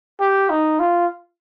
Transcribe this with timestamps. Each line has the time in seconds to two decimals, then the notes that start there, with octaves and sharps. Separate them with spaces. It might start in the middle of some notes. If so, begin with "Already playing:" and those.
0.20 G4
0.50 D#4
0.79 F4